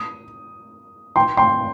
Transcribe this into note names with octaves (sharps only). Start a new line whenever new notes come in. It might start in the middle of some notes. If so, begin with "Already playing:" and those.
Already playing: D#6
G5 C6
G5 C6